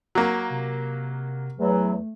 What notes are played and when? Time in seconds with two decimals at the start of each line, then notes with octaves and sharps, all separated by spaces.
0.15 F#3 A#3
0.50 C3
1.59 E2 F#3 A3